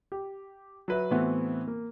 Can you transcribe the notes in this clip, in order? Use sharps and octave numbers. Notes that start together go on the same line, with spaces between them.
G4
F#3 B4 E5
A2 E3 B3 C4 F#4
A#3